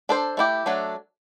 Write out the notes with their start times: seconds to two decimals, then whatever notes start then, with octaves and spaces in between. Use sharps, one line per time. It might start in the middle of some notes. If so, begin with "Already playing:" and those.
0.09 D4 A4 C5
0.37 A3 E4 G4
0.66 F#3 A3 D4 A4